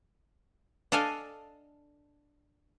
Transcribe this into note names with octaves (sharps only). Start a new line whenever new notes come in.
D4 A4 D#5 F5 G#5